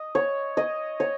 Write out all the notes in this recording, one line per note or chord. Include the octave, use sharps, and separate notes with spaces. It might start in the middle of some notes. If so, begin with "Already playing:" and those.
Already playing: D#5
C#5
D#5
C#5